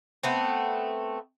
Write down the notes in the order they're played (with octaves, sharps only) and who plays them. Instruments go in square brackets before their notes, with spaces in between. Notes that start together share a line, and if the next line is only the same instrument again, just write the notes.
[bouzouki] A3 B3 C4